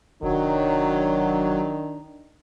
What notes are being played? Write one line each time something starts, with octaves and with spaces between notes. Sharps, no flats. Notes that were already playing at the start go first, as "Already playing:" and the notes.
F1 D#3 F#3 D4